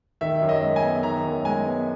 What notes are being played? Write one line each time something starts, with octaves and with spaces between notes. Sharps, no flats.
D#3 E5
F#2
D#5
G#3
G#5
B3
D#3 A#5
F#2
G#3 G#5
B3